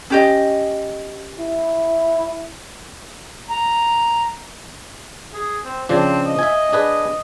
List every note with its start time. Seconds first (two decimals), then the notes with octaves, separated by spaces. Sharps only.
0.10 C#4 G4 D#5
1.39 E4
3.50 A#5
5.34 G#4
5.65 C4
5.89 C#3 F3 C4 D4
6.26 D#5
6.39 E5 G#5
6.72 D4 G#4 B4